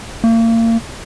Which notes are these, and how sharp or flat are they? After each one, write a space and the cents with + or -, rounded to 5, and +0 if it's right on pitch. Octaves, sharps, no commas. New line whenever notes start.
A#3 -35